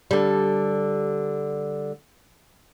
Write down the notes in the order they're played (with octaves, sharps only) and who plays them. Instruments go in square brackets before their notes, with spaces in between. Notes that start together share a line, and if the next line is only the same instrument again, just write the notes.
[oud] D3 G3